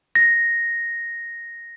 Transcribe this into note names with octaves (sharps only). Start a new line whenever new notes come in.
A#6